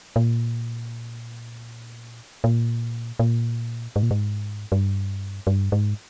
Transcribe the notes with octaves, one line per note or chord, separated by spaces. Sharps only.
A#2
A#2
A#2
G#2
A#2
G#2
G2
G2
G#2